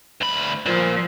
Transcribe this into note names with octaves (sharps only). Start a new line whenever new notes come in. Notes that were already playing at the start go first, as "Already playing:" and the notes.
D2 B5
A#2 F3